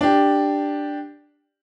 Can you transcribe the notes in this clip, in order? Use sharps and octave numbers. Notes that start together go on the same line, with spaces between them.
D4 G4